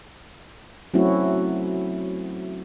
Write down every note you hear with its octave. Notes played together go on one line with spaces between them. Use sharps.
F#3 A3 C4 C#4 E4 F#4